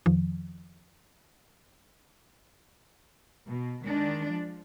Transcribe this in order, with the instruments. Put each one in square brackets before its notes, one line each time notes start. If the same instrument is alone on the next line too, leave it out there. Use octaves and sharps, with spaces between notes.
[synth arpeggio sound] F2 D#3 F3
[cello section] B2
D#3 G#3 D4
F3